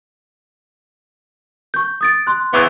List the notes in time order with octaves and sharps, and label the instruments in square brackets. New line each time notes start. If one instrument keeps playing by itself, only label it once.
[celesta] C#6 G6
D#6 A6 D7
C6 F#6
[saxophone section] C#3 E3 B3 [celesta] D6 E6